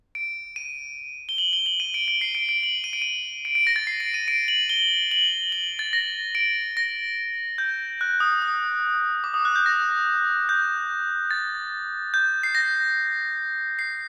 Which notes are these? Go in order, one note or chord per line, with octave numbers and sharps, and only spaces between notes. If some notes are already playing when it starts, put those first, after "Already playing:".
D7
D#7
G7
F#7
G7
F#7
D#7
D7
D7
C7
D7
D7
F#7
D#7
D7
D#7
D7
D7
A#6
A6
C7
D7
D#7
D7
F#7
G7
F#7
F#7
A6
A#6
D7
A#6
G6
F#6
D#6
D#6
D6
D#6
F#6
G6
A#6
G6
A6
G6
C7
A#6
C7